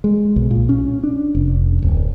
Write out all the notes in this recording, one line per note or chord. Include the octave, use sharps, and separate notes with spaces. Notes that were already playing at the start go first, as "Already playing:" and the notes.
G#3
B1
A#2
C#4
D4
F1
D1